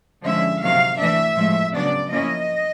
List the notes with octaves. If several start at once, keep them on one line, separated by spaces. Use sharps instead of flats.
D3 F3 G#3 C#4 E4 E5
C3 D#3 F#3 A#3 F5
E3 A3 D4 E5
A2 F3 G#3
C#3 F#3 B3 D4 D5
F3 A#3 C#4 E4 D#5